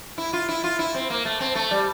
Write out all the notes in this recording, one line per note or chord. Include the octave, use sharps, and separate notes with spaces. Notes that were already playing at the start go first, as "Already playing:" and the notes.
E4
F4
E4
F4
E4
C4
A#3
A3
C4
A3
G3